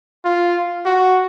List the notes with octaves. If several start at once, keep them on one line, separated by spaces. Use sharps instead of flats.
F4
F#4